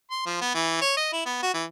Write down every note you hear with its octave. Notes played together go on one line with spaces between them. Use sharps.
C6
F3
B3
E3
C#5
D#5
E4
B3
F#4
E3